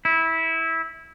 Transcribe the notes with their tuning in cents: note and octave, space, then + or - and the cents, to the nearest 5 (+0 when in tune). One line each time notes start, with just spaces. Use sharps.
E4 -15